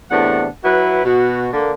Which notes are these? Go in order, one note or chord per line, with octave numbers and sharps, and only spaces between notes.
E2 A2 C3 B3 D4 F#5
F#3 E4 F#4 B4
B2 F#4
D3 A#3